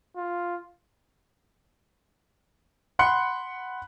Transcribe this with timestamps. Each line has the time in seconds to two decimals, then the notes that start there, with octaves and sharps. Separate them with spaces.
0.17 F4
2.99 F#5 B5 C6 F#6 C#7